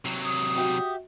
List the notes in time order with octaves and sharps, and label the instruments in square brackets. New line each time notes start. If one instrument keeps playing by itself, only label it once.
[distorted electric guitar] C3 F#3
[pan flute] D#6
[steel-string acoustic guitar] F#4 G4 E5